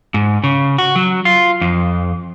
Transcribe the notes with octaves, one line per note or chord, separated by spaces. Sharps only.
G#2
C#3
F#4
F#3
F4
F2